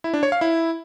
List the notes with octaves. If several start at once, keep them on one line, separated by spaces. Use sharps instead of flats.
E4
D4
C#5
F5
E4